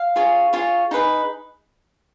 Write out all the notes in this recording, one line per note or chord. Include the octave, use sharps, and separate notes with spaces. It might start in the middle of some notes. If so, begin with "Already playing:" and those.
Already playing: F5
F4 G#4 C#5
F4 G#4 C#5
D#4 G#4 B4 D#5